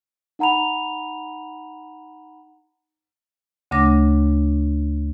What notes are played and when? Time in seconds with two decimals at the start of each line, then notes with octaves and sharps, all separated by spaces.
0.39 D#4 F#5 A#5 B5 F7
3.71 D2 C#3 A3 D4 D6 A#6